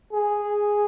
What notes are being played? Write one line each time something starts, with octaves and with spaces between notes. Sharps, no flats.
G#4